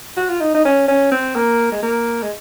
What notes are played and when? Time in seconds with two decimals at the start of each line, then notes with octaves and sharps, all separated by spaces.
0.17 F#4
0.29 F4
0.41 D#4
0.55 D#4
0.65 C#4
0.88 C#4
1.11 C4
1.36 A#3
1.72 G#3
1.83 A#3
2.23 G#3